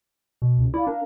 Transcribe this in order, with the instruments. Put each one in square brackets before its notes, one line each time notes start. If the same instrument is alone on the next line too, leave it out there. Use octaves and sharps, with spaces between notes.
[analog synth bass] B2
[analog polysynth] C#2
[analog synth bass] E4 [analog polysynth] D5 F5
[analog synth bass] D4 [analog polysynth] A#4 F5